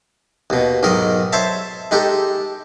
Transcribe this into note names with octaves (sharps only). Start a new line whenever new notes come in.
D#2 B2
B1 G#2 D#3 A#4 D#5
C5 C#5 E5 A5
G#3 D#4 G4 A4